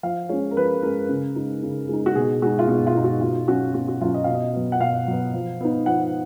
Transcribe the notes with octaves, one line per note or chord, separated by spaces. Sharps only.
F3 F5
G#3 C#4 C#5
A#4
F3 B4
G#3 C#4 A#4
C#3
G#3 D#4
C#3
G#3 D#4
F#4
B2 G#4
G#3 D#4 F#4
F4
B2 F#4
F4
G#3 D#4
F#4
B2 F4
F#3 C#4 F#4
B2 F#4
F#4
F#3 C#4 F4
D#5
B2 F5
D#5
F#3 B3
F#5
B2 F5
F#3 B3
F3
B3 D#4
F3 F#5